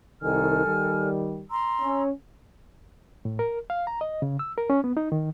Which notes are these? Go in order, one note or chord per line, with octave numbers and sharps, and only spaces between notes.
C2 D#3 A4 G#5 F6
D#3 G3
A#5 C6 E6
C#4
A2
A#4
F5
A#5
D#5
C#3
E6
A#4
C#4
B3
D#4
D#3